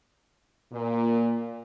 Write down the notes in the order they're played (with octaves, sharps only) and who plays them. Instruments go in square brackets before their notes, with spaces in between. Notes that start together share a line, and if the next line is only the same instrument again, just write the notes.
[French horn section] A#2